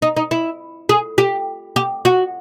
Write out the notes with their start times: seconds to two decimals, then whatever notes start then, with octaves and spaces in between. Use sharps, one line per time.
0.02 D#4
0.17 D#4
0.31 E4
0.89 G#4
1.18 G4
1.76 G4
2.05 F#4